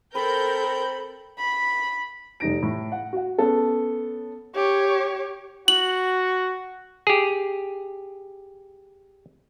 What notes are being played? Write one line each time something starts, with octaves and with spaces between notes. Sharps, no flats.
C4 A4 A#4 B5 G6
B5
F1 G3 D#4 A#6 D7
A2
F#5
F#4 F#5
B3 C#4 A4
G4 C#5
F#4 F#7
G4 G#4